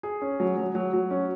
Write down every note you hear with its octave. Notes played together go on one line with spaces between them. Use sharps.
G#4
C#4
F#3
F#3
F#3
F#3
C#4